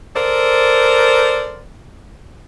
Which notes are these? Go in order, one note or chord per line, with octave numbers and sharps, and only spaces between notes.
A4 A#4 C5 D5